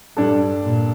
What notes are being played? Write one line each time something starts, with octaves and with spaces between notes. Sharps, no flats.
G2 G3 D4 A4
A#2